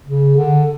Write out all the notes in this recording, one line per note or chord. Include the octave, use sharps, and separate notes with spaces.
C#3
D3